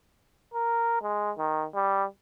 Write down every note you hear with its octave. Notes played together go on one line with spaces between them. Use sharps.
A#4
G#3
D#3
G3